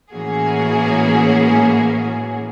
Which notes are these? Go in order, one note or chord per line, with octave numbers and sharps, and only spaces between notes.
A2 E3 A#3 C#4 F#4 G#4